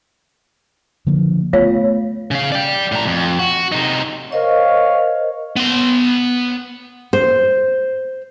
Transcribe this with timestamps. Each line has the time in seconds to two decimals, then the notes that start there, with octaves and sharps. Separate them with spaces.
1.07 D3 F3 A#3
1.53 A3 B3 F4 C#5 F5
2.31 C#3 F5
2.52 D5 G5
2.92 A2 A#5
3.07 F2
3.39 F#4
3.72 C3 D#4
4.32 A#4 C5 C#5 D#5 F5
5.56 B3 C6
7.13 C5